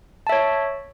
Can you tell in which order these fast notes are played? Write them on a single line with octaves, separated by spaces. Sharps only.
A5 E5 C#5